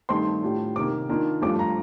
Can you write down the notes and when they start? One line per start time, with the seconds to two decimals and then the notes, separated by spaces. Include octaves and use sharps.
0.09 G2 D#3 A3 C4 C6
0.43 A2 G3 D4 F4
0.76 C3 D#3 A#3 D6
1.09 D#3 A#3 D4 F4
1.42 G2 F3 A3 D4 F4 D6
1.59 A#5